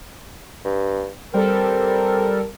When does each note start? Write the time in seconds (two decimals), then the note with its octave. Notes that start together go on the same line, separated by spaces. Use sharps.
0.65 G2
1.34 G3 C4 A4 A#4